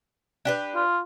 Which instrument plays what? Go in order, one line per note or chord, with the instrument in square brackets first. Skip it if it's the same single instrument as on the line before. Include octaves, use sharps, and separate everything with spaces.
[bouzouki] D4 G4 B4
[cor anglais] F4